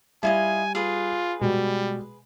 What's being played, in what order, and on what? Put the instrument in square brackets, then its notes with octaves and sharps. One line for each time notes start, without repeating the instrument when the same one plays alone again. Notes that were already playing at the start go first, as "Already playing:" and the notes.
[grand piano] G3 [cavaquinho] E4 F4 D#5 [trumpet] G#5
[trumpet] F4 [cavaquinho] G#4 B4
[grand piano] B2 G#3 [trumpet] G3